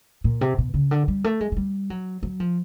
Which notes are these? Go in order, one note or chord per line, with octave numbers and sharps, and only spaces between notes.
A#2
C3
B2
C#3
D3
G3
A3
G#3
G#3
G3
F#3
F#3
F3